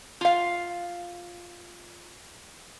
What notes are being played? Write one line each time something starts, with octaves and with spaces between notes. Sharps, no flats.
F4 F5